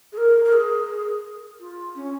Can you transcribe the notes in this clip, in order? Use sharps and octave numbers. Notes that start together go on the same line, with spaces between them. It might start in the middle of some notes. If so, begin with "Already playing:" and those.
G#4
A#4
A#4
G#4
F4
C#4